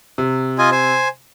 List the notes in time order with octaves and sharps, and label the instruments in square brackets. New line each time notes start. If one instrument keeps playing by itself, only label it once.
[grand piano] C3
[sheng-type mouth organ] F4 D#5 G#5
C5 G#5